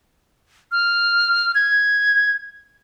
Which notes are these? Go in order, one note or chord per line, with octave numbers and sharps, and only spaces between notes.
F6
G#6